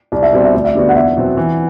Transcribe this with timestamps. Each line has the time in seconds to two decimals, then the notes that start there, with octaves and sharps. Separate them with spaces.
0.12 C2 D5
0.23 E5
0.32 B2 G3 C4 D5
0.44 E5
0.54 D2 D5
0.65 E5
0.75 D3 G3 B3 F#4 D5
0.89 F#5
0.95 E2 E5
1.17 B2 F#3 C4
1.37 E3